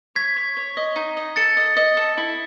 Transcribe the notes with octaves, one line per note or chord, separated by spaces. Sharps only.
C#5 G#6 B6
C#5
C#5
D#5
D#4
D#5
A4 A6 C#7
D#5
D#5
A4
E4